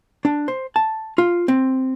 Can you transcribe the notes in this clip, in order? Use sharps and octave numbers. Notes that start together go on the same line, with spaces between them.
D4
C5
A5
F4
C4